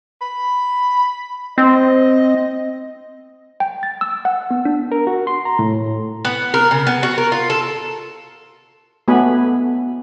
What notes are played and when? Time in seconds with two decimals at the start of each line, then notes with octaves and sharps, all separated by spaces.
0.22 B5
1.58 C4 D#5
3.60 G5
3.83 A6
4.01 E6
4.25 F#5
4.51 B3
4.65 D4
4.92 A#4
5.07 F#4
5.27 C6
5.45 A#5
5.59 A2
6.25 B3
6.54 A#4
6.71 C#3
6.87 B3
7.03 F#4
7.18 A#4
7.32 F4
7.50 A4
9.08 A3 B3 F#4 G#5 B5